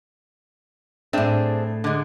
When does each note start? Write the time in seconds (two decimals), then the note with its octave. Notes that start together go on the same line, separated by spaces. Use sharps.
1.13 A2 C4 D4 G#4 E5
1.84 D3 G#3